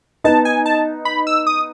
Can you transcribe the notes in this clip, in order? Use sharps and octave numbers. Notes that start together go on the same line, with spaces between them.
B3 D#4 A5
G#5
A5
B5
E6
D#6